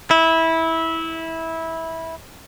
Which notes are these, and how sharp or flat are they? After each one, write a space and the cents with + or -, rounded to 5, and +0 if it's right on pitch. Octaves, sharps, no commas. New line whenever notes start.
E4 -15